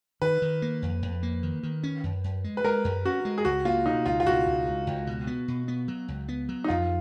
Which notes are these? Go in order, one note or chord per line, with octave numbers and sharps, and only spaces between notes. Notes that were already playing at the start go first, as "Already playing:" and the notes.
D#3 B4
D#3
A#3
F2
F2
A#3
D#3
D#3
C#4
F#2
F#2
G#3
B4
G#3 A#4
F#2
C#4 F#4
G#3
G#4
C#2 F#4
A#3 F4
B2 D#4
C#2 F4
F4
B2 F#4
C#2
C#2
C#2
B2
B3
B2
B3
F#3
C#2
B3
F#3
D#4
F2 F4